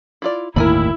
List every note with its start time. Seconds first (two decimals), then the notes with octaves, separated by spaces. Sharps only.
0.22 E4 F4 D5
0.56 G1 D#2 A2 D#3 E4 A#4 G#5 B5